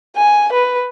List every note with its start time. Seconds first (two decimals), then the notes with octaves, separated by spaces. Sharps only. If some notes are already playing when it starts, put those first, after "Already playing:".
0.16 G#5
0.52 B4